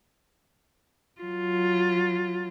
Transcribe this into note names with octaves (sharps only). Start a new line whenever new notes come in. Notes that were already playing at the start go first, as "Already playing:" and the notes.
F#3 F4